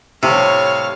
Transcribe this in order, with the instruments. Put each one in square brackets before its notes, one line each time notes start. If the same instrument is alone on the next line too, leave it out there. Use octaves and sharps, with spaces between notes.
[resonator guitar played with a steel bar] A2 G3 [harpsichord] C3 [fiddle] C#5 F5